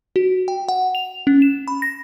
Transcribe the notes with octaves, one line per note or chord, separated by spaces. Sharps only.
F#4
G5
F#5
F7
C#4
E7
B5
A#6